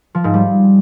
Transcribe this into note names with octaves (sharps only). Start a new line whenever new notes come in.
F3
G#2
G3